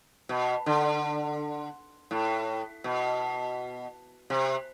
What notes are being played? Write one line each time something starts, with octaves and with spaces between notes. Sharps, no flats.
B2
D3
A2
B2
C3